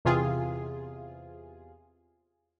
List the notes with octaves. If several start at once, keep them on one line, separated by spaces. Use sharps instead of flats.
E2 C3 F4 G#4